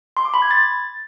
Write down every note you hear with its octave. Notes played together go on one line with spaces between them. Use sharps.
C6
D6
B5
G#6
A6